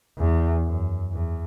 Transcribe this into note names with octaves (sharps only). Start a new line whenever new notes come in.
E2
F#2
E2